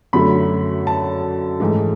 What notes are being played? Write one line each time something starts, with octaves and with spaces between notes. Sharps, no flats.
F#2 D3 F#3 A3 B5
A5
G#2 E3 A3